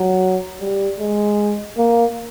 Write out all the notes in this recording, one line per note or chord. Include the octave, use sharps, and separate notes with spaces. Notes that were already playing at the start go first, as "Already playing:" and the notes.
Already playing: F#3
G3
G#3
A#3